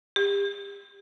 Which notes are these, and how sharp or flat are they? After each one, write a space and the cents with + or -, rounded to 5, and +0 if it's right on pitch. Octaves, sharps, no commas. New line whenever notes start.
G4 +35